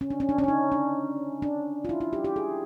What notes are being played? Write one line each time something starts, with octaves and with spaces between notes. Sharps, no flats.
C#4
D4
C#4
D4
C#4
D4
D#4
D4
D4
F4
E4
E4
G4
G4
G#4